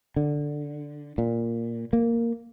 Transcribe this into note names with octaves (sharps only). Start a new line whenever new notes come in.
D3
A#2
A#3